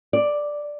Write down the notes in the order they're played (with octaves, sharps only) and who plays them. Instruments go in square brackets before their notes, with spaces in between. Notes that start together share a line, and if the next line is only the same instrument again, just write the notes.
[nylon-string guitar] D5